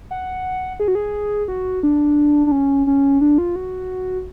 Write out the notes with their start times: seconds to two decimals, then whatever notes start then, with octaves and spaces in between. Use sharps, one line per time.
0.11 F#5
0.80 G#4
0.88 F#4
0.95 G#4
1.48 F#4
1.83 D4
2.46 D4
2.52 C#4
2.87 C#4
3.21 D4
3.38 F4
3.56 F#4